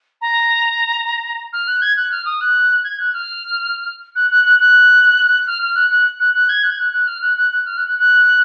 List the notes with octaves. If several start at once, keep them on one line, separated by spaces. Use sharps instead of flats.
A#5
F6
F#6
G#6
F#6
F6
D#6
F#6
G#6
F#6
F6
F#6
F#6
F#6
F#6
F6
F6
F#6
F#6
F#6
F#6
G#6
F#6
G#6
F#6
F#6
F6
F#6
F#6
F#6
F6
F#6
F#6
F#6